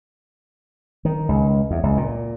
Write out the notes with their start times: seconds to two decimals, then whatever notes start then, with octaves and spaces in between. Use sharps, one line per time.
1.05 D#3
1.29 C#2
1.71 E2
1.83 C#2
1.97 A#2